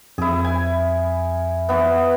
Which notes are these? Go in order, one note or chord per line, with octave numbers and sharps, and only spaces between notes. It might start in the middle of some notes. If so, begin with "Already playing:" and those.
F2 E4 G#4
G#5
E3 B3